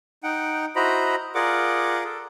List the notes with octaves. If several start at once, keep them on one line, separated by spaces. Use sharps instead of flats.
D#4 F#5 G5
E4 F#4 C5 D#5 A#5 B5
F4 G#4 A#4 D5 F#5 D6
A4